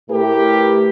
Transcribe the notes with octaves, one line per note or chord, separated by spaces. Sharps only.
A2 A3 E4 G4 A#4 B4